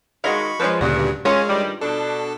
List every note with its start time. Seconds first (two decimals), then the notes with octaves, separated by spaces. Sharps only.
0.24 D#3 G#3 F#4 D#5 F5 B5 C#6
0.60 F3 G#3 C#4 B4
0.81 D2 G2 A#2 C#3 F#4
1.25 G#3 C#4 F4 A#4 C#5
1.49 G2 D#3 G3
1.81 B2 D4 A4